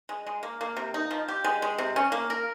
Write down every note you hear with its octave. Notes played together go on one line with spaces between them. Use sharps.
G#3
G#3
A#3
A#3
C3
D#4
F3
G4
G#3
G#3
C3
C#4
A#3
A#4